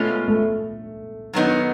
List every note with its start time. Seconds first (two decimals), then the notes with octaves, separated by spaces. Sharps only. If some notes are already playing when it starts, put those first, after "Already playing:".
Already playing: B2 G#3 A3 C#4 F4
0.28 A3
1.33 F#2 D#3 F#3 B3 D#4